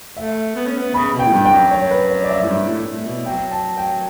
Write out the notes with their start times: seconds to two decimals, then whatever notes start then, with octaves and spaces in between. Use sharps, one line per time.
0.17 A3 E5
0.55 B3
0.66 C#4
0.77 B3
0.94 C#3 B5
1.13 B2
1.19 G5
1.26 A2
1.33 G2
1.46 G5
1.52 F#2
1.71 C#5
1.91 B4
2.10 C#5
2.24 D5
2.29 E5
2.42 A2
2.48 G2
2.68 A2
2.87 A2
3.06 B2
3.26 F#3 G5
3.52 A5
3.77 G5